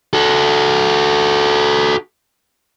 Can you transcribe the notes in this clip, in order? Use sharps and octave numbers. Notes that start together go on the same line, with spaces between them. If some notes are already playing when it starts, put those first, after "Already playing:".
F#4 A4